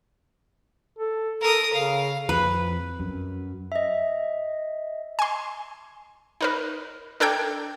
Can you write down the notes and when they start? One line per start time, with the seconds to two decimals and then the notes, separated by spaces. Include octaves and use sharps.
0.99 A4
1.41 A4 A#4 D#6
1.72 C#3 F5
2.29 F2 B4
3.00 F#2
3.72 D#5 E5
5.19 G#5 C6
6.41 D#4 A#4 B4
7.20 D4 A4 A#4 G5 G6 G#6